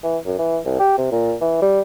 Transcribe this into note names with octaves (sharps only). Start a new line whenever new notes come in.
E3
F#2
E3
C2
G4
C3
A#2
E3
G3